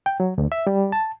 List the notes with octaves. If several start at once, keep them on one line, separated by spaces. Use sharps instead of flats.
G5
F#3
D2
E5
G3
A5